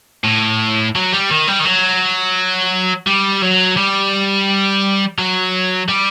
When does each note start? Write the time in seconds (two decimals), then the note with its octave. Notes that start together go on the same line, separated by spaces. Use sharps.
0.24 A2
0.95 F#3
1.13 G3
1.30 D#3
1.48 G3
1.60 D#3
1.65 F#3
3.07 G3
3.42 F#3
3.77 G3
5.18 F#3
5.89 G3